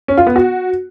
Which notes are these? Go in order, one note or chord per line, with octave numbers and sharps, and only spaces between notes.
C#4
F4
B3
F#4